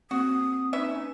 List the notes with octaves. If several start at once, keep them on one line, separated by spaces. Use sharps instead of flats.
A#3 C4 F#4 D#6
C#4 D#4 B4 E5
G#5